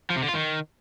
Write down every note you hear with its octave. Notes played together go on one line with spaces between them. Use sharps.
F3
C3
D3
F4
D#3